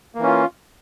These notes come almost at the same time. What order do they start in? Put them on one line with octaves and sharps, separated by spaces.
A#3 E3 C#4 F4